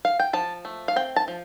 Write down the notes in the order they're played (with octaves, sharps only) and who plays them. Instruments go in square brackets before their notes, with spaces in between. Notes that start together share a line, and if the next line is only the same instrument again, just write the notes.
[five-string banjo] F5
G5
F3 A5
A3
F5
C4 G5
A5
F3